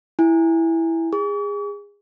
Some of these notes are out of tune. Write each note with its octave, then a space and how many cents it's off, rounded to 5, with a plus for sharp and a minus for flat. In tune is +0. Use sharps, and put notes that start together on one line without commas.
E4 +0 G#5 -25
G#4 -25 C#6 +45